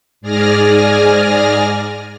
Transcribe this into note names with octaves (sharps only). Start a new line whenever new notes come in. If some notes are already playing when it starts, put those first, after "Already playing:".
G#2 G#4 D5 G#5 F6 A#6